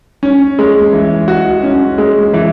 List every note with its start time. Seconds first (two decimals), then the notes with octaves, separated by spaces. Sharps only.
0.23 C#4
0.59 G#3
0.93 E3
1.28 F#4
1.63 C#4
1.98 G#3
2.34 E3